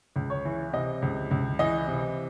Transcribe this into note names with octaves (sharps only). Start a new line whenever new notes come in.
C#2
C#5
E3
C3 D#5
C#2
C#2
E3 D#5
C3